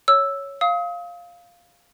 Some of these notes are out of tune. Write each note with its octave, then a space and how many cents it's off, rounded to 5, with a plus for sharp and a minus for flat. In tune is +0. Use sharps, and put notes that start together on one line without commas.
C#5 +0 E6 +0
F5 +0 D#6 +40